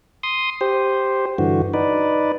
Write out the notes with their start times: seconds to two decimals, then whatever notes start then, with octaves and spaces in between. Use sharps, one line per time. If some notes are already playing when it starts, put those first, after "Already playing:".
0.23 C6 D#6
0.61 G4 C5
1.38 G2 D3 E3 F#4
1.74 D#4 B4 D5